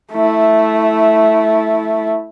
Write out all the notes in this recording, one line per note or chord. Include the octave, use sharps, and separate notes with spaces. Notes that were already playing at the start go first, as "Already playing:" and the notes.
A3 E4